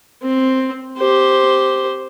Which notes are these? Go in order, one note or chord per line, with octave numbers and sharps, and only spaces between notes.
C4
G4 C5